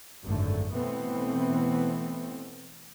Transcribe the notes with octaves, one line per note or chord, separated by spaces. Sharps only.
G#1 F#2 D3 A3
B2 E3 A3 B3 C4